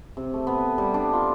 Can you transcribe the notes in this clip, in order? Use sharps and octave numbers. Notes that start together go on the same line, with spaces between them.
C3
A3
B3
G3
D4
F4